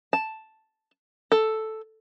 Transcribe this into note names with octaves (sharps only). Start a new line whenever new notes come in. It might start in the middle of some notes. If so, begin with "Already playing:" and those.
A5
A4